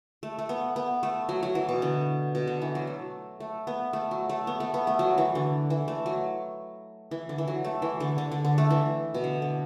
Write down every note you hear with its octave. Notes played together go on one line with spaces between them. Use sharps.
A3
A3
B3
B3
A3
F#3
F#3
E3
B2
D3
B2
D3
E3
F#3
A3
A3
B3
A3
F#3
A3
B3
A3
B3
A3
F#3
E3
D3
E3
A3
F#3
E3
D3
E3
F#3
A3
E3
D3
D3
D3
D3
A3
E3
B2
D3
D3